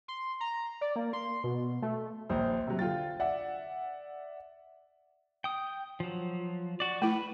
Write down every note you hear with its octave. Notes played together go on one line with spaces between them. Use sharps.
C6
A#5
D5
A#3
C6
B2
A3
A#1 D#2 C5 D#6
C3 F#3
D3 F4 G5 A6
D5 E5 F#5
G5 D#6
F3 F#3
F#4 D5
A3 E4 B4